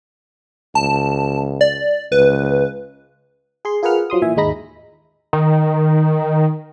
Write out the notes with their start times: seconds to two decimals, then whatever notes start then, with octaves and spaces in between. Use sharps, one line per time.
0.75 C#2 A5
1.61 D5
2.12 C#2 B4
3.65 G#4 C6
3.83 F4 G#4 A#4 B4 F#5 F6
4.10 F3 F#3 C6 D#6
4.22 A#2 E3 E5 G#5
4.36 D#2 G#2 G#3 D#4 B5 A#6
5.33 D#3